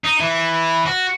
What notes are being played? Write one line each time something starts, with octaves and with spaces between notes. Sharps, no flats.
D#4
E3
F#4